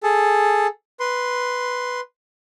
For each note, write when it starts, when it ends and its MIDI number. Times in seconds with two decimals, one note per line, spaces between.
0.03 0.67 68
0.03 0.67 69
1.00 2.00 71
1.00 2.00 84